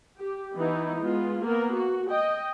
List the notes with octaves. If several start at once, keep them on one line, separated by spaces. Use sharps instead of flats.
G4
E3 B3 D#4 E4
G#3 B3 F4
A#3 B3 A#4
F#4
D#5 G5